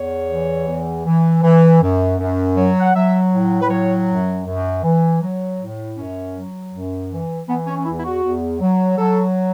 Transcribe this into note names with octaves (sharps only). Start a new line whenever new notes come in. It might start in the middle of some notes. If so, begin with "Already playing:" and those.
Already playing: E2 C#5
E3
E2
E3
E3
F#2
F#2
F#3
F#5
F#3 E5
A2
B4
F#3 C#5
F#2
F#2
E3
F#3
A2
F#2 C#4
F#3
F#2
E3
E3 B3
C#4
C#4
E2 E4
E4
F#4
E2
F#3
F#3 A4